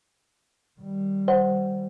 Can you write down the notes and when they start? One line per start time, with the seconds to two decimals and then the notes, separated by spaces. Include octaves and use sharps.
0.80 D#3 G3
1.28 C5 F#5